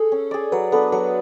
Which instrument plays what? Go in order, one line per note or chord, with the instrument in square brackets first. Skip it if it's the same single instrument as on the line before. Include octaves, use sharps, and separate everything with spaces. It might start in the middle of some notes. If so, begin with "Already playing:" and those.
Already playing: [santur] G#4 [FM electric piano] A4
[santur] C#4
G#4 D5
[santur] F#3 [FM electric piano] B4
[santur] B3 D4 [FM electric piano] A4
[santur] F#3 [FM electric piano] A4